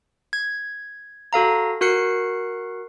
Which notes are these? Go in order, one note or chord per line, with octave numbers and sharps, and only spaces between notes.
G#6
F#4 A4 F5 A#5
F#4 A#4 F#6 C7 C#7